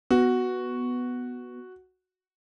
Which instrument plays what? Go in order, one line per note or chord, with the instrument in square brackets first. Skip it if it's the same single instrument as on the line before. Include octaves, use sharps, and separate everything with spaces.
[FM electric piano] B3 [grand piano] F#4